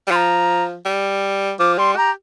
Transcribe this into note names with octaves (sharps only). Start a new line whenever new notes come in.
G3
F3 C6
A#5
G3
F3 D6
G3 C6
G4 A#5